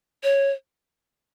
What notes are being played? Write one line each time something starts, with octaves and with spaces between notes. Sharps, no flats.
C#5